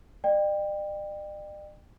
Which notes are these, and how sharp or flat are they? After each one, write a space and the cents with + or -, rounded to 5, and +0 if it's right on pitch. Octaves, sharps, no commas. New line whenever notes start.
D5 +45 G5 +15